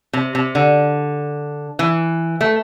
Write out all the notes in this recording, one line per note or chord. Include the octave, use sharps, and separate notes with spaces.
C3
C3
D3
E3
A3